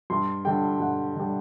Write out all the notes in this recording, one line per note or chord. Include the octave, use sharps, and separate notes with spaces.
G2 C6
D3 G3 G5
G2 F#5
D3 G3